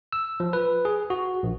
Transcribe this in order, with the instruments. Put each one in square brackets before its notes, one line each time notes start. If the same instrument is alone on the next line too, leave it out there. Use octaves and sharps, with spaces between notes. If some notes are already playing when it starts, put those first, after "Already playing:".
[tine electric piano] E6
F3
B4
G#4
F#4
A#1